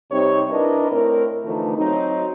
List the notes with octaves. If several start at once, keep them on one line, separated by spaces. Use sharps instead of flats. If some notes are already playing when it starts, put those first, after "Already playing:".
C3 G3 C4 D#4 C#5
D4 E4 A#4 B4 D#5
A2 C4 A#4
D3 E3 F3 A3 D#4
F#3 C4 D#4